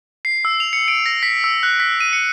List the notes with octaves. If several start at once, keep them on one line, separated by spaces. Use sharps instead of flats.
C7
E6
F7
C#7
D7
A#6
B6
E6
F#6
B6
D#7
C#7